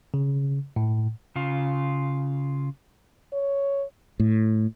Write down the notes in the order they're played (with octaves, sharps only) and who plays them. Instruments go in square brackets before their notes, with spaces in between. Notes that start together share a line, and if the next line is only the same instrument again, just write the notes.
[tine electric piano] C#3
A2
[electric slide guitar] C#3 F4
[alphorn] C#5
[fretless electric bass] A2